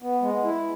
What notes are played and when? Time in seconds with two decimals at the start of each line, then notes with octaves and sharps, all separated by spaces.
0.02 B3
0.22 G#3
0.44 E4